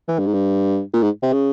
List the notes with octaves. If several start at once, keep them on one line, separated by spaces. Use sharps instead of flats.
E3
G2
G#2
G2
A#2
G#2
C3
C#3